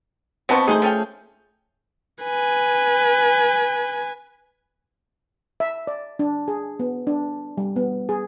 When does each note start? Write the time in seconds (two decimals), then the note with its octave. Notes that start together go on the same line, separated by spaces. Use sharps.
0.49 B2 F3 B3 C4 A5 C#6
0.67 A3 D#4 G#4 B4 C5
0.82 F3 C#4 G5
2.23 B4 G#5
5.60 E5
5.87 D5
6.19 D4
6.48 G#4
6.80 B3
7.07 D4
7.57 G3
7.76 B3
8.09 G#4